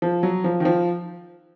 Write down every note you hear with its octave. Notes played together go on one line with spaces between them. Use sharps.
F3
F#3
F3
D#3
F3